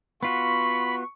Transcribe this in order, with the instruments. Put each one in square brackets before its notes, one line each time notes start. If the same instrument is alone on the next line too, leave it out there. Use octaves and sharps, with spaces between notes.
[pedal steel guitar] B3 F4 F#4 [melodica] B5 [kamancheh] C#6